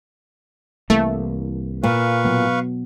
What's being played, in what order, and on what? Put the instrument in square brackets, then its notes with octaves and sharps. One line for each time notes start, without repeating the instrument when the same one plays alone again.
[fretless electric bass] C2 E3 A#3 [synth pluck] A3
[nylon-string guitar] A#2 [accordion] B4 F5 C#6
[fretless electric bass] B2 F#3 B3